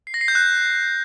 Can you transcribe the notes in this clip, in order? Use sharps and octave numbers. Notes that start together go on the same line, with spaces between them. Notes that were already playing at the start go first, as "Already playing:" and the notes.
C7
A#6
C7
G6
F#6